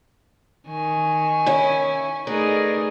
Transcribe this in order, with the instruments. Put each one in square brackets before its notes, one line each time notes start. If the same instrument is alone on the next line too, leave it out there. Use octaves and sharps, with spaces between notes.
[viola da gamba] D#3 [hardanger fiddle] G#5 C#6
[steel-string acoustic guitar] C#4 E4
[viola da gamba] A3 D#4 G#4 [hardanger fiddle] A#4 D5 [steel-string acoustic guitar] B4